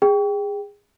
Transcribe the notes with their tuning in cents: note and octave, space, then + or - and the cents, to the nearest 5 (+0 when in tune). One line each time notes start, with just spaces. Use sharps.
G#4 -20 G5 +0